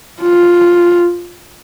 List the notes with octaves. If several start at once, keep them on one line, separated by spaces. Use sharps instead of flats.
F4